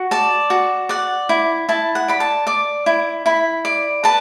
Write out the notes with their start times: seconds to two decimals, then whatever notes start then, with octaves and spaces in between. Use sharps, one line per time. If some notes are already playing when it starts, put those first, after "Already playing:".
Already playing: F#4
0.11 D5 A5
0.50 F#4
0.89 D5 F#5
1.29 E4
1.69 E4 A5
1.95 F#5
2.08 D5 B5
2.20 A5
2.47 D5 D6
2.86 E4
3.26 E4 B5
3.65 D5
4.04 B4 A5